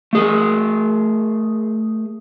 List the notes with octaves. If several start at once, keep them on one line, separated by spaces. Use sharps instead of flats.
A3 G#4 A#4